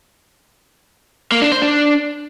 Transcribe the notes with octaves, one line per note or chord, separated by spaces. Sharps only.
A#3
D4
C5
D4